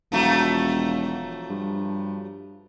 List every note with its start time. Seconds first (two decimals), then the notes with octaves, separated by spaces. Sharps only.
0.12 E1 F3 F#3 A3
1.50 G2